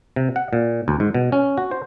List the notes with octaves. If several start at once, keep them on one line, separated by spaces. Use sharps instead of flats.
C3
F#5
A#2
D2
G#2
B2
C#4
F#4
C5